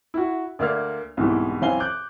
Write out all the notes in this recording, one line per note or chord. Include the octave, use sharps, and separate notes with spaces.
E4 F#4
D2 A#3 D5 E5 F6 G#6
C2 G#2 B2 E3
F#2 E3 C4 F5 G#5 G7
D6 F#6 G6